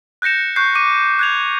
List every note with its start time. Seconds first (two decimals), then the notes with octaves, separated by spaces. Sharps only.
0.22 F#6 G6 A#6 C#7 E7
0.56 C#6 F#6 G6 C7
0.75 D6 D#7
1.19 F#6 G#6 F7